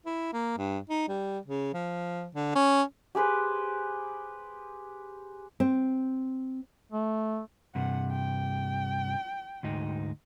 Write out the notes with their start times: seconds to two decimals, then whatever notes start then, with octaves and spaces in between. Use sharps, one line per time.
0.06 E4
0.33 A#3
0.58 G2
0.90 D#4
1.08 G3
1.46 C#3
1.74 F3
2.35 D3
2.55 C#4
3.15 G4 G#4 B4 C5
5.60 C4
6.92 A3
7.75 G2 C3 F#5
8.11 G5
9.63 D2 G#2 D#4